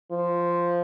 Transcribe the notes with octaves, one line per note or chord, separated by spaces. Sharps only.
F3